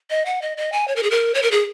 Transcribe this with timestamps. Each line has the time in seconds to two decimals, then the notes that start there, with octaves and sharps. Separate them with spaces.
0.10 D#5
0.25 F#5
0.42 D#5
0.57 D#5
0.72 G#5
0.88 C#5
0.96 A#4
1.03 G#4
1.11 A#4
1.34 C#5
1.42 A#4
1.51 G#4